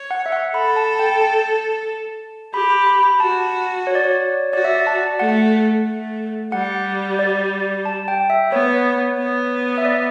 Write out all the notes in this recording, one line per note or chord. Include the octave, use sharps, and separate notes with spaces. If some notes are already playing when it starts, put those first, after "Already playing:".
Already playing: C#5
F#5
E5
F#5
A4 B5
A5
G5
A5
G4 B5
B5
B5
B5
F#4 A5
C#5
D5
C#5
F#4 D5
E5
D5
A5
A3 F#5
A3
G3 F#5
D5
A5
G5
E5
B3 C#5
B3
E5
D5